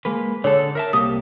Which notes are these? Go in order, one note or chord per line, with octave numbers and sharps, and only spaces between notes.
G#3 A#3 B4
D3 G#4 A4 C#5
A#4 E5 A5
C2 A#3 G4 D#6